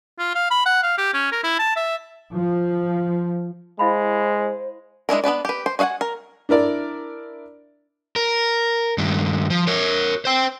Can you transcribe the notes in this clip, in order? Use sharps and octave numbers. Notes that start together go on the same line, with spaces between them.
F4
F5
B5
F#5
F5
G4
C#4
A#4
E4
A5
E5
F3
G#3 E4 C5 F5 B5
G#3 D4 E4 A#4
B3 D4 B4 D5
G4 B4
C5
F#4 D#5 F5 F#5 G#5
A#4
D4 E4 A#4 D5
A#4
G2 D#3
F3
A#4 C#5
C5 G5